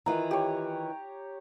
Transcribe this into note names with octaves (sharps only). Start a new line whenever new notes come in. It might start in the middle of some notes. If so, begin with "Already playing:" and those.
D#3 E3 F4 A#5
G4 C#5